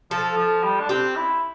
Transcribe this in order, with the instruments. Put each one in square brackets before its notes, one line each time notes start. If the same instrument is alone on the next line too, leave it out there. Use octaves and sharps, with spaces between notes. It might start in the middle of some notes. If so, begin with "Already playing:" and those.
[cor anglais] F3 [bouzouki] A4
[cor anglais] F3
G3
D4
[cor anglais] C4 [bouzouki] G4
[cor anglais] E4